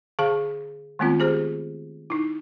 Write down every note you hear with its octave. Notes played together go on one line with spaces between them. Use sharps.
D3 G#4 F5 A5
D#3 G#3 A3 B3 C4 F4
G4 G#4 C5
D#4 E4